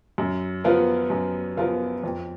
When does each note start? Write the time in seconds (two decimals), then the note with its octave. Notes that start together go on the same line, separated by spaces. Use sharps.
0.18 F#2
0.64 F3 B3 F4 A#4
1.10 F#2
1.57 F3 B3 F4 A#4
2.04 F2